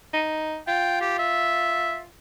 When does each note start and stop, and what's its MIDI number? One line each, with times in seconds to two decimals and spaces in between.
0.13 0.58 63
0.68 2.08 65
0.68 0.98 79
1.01 1.16 67
1.19 2.00 76